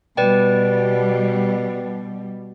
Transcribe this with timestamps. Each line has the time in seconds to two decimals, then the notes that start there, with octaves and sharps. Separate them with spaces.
0.17 B2 G3 B4 D5 G5